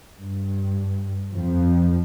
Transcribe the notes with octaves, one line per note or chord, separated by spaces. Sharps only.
G2
F2 F3